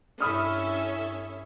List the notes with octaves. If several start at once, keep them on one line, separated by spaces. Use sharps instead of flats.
G2 C#4 E4 A4 E5 B5 D#6 F6